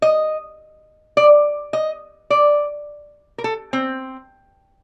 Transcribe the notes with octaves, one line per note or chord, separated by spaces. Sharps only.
D#5
D5
D#5
D5
A#4
A4
C4